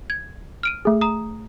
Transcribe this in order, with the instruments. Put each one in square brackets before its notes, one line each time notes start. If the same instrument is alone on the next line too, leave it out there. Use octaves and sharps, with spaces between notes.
[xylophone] G#6
F6 D7 D#7
[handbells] A3 G#4
[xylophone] A#5 D#6